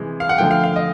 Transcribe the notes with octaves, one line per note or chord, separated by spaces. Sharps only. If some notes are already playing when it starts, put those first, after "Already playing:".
Already playing: C3 E3 G#3
F5
F#5
D3 F3 A3 G5
F5
F5
D#5